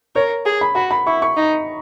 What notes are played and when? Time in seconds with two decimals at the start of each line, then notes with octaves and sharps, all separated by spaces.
0.15 A#4 C#5
0.46 G#4
0.61 B5
0.75 F#4 B5
0.91 B5
1.07 E4 C#6
1.22 C#6
1.37 D#4